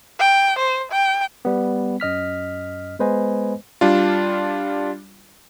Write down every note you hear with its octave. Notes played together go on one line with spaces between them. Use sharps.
G5
C5
G5
G3 B3
F#2 D#5 F6 B6
G#3 B3 B4 C5 D#5 G#5
G3 D4 F4